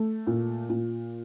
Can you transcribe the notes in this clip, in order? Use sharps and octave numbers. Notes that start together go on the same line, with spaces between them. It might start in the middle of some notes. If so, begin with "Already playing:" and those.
Already playing: A3
A#2
A#2